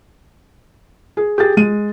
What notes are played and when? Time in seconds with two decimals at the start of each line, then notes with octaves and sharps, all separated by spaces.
1.17 G#4
1.38 G4 G#4 A6
1.57 G#3 D#7